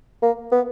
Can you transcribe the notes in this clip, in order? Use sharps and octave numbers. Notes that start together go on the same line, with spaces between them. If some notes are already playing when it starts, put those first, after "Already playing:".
A#3
B3